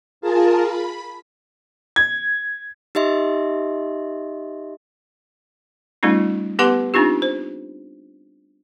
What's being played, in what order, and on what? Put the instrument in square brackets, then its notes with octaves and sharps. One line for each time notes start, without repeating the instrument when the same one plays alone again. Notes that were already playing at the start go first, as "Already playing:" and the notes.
[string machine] F4 G#4 A#4 A5
B5
[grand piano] G#6
[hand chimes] D#4 G4 D#5 E5 C6
[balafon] G3 A3 C#4 D#4 F4
B3 G4 B4 F#5 C6 D6
C4 D4 D#4 F4 G4
C5